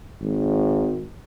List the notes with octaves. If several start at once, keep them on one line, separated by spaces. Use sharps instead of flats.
G#1